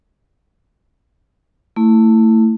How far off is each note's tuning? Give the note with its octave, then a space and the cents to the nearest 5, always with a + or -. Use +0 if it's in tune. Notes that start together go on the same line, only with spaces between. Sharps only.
A3 +25 E4 +0